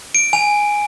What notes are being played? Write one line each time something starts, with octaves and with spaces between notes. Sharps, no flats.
D7
G#5